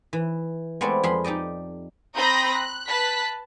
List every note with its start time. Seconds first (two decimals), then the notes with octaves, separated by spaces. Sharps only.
0.13 E3
0.81 G#3 A3 B3 C4 D5
1.03 F2 G#4 B5 C6
1.24 D#4 G4 D5 D#5
2.14 C4 A#5 B5 D#6 G6 A#6
2.54 F#6
2.87 B4 A5 F#6 B6